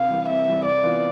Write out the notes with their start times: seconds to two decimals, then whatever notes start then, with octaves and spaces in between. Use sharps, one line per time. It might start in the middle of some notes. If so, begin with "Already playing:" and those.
Already playing: C3 F5
0.10 E3 G3
0.29 C3 E5
0.48 E3 G3
0.65 C3 D5
0.83 E3 B3 F4